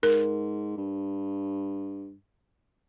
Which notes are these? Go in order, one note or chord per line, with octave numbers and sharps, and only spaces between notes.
G#2 A#4
G2